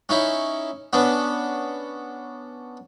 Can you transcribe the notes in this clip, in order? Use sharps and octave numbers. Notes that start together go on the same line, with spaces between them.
C#4 D#4 E4
B3 C#4 D4